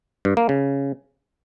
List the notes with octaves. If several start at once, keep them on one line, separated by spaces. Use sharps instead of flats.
G2
A#3
C#3